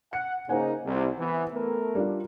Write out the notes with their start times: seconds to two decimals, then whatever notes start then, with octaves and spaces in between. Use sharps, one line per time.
0.13 F#5 C#7
0.49 C#3 A#3 D#4 C5 F#5 G#5
0.85 C2
1.18 E3 B3
1.53 A3 B3 A#4
1.95 G3 D4 F4